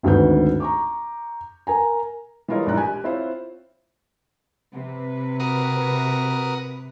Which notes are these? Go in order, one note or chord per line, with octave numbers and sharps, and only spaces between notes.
G#1 D2 D#3 D4 B4 G6
A#5 C#6 D6
A#4 G#5 A#5
E3 G3 F4 A#4 C#5 D#5
A#1 G#2 E3 D5 A#5 F#6
G4 G#5
C4 E4 F4 C5 C#5
C3 B4
F#4 A#4 D#6